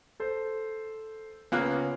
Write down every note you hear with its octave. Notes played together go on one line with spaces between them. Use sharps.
A4 C5
C#2 C#3 A#3 B3 C#4 F4 F#6